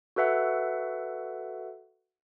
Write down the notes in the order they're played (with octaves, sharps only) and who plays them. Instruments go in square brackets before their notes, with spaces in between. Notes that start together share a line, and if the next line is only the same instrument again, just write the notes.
[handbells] F#4 A4 B4 E5 F#5